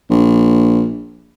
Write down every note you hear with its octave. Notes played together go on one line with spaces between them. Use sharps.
A#1